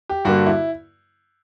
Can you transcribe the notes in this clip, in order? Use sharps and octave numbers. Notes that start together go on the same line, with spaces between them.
G4
G2 D3 A#3 F#4
E4